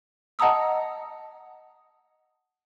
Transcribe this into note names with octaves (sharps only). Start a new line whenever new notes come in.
D#5 F#5 A5 A#5 D#6 E6